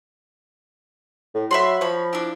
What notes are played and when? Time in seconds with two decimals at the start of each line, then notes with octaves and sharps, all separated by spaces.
1.35 A2
1.51 F#3 E5 B5 C6
1.81 F3 C#5 B5
2.13 D4 E4